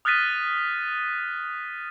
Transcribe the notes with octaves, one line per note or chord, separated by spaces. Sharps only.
D#6 F6 F#6 A6 B6 D#7